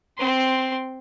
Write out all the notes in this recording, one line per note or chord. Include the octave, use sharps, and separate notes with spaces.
C4 C6